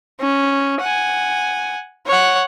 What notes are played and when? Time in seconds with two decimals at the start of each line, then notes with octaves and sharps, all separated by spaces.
0.21 C#4
0.81 F#5 G#5
2.07 C#5 F#5